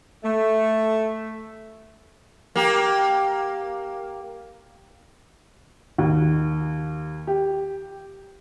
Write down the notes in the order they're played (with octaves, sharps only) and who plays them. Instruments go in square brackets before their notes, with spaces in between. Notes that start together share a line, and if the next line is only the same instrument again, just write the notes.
[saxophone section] A3
[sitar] A#3 G4
[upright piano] D#2
G4